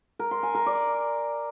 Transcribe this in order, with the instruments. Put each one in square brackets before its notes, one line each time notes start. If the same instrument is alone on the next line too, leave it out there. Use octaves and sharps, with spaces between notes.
[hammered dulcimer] A#4
C6
G#5
A#4
D5